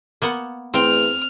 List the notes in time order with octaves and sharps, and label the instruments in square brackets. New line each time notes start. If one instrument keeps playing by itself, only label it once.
[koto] A#3 B3 F#5
[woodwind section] E2 A3 [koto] C4 G5 [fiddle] F6